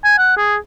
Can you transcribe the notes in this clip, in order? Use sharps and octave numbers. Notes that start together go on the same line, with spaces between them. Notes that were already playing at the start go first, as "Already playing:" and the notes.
G#5
F#5
G#4